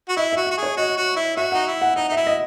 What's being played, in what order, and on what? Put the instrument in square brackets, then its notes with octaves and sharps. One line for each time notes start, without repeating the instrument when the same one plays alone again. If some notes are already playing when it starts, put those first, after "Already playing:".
[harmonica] F#4
[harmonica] E4 [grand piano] D#5
[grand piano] E5
[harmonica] F#4
[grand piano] E5
[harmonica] F#4
[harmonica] G#4 [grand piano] C#5
[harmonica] F#4 [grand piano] D#5
[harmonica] F#4
E4
[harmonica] F#4 [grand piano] E5
[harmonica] D#4 [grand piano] F#5
[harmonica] E4
[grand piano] F#5
[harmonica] D#4 [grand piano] F#5
[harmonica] D#4
[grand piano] E5
[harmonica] E4
[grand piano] D#5